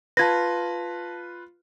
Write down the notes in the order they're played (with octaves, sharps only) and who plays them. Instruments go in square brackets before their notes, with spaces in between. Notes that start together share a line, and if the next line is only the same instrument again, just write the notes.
[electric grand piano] F4 B4 [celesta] A5 G#6 A#6